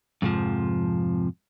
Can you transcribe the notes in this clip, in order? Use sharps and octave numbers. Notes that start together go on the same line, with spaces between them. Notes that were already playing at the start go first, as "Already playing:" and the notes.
F2 G#2 C3 F3